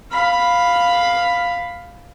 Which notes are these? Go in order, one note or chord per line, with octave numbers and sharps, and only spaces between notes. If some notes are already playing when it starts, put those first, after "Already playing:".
F5 B5